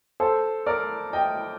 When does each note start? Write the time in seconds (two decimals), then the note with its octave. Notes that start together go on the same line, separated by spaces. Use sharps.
0.20 A4 C5
0.66 A#4 D5
1.13 D#5 G5